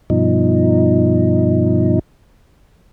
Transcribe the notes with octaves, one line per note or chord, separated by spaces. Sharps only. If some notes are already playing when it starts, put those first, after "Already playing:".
G2 B2 F3 D#4